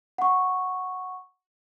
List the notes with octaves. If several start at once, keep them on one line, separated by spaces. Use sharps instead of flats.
F#5 C#6